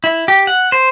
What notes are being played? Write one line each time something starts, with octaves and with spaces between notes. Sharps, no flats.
E4
G4
F#5
C5